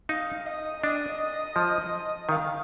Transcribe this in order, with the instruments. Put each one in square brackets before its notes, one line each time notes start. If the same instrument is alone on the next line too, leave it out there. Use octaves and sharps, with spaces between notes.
[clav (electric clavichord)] D#4 [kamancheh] F5
[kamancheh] D#5
[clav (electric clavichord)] D4 [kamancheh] D#5
[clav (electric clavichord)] F3
[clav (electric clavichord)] D#3 [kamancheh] F5